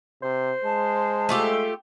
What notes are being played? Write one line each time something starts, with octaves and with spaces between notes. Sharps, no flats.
C3 C5
G#3 A5
A3 F4 G4